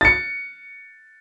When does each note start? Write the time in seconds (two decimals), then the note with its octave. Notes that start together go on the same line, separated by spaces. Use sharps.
0.01 A6 C#7